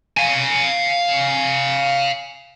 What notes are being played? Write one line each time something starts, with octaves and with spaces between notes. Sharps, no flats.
F5 G#5